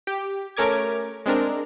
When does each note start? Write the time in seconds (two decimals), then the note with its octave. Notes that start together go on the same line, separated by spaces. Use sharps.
0.07 G4
0.57 A3 C#4 A#4 D6 G#6
1.26 G#3 C4 D4 A#4